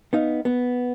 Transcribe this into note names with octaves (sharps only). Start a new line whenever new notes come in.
B3 D#4 F5
B3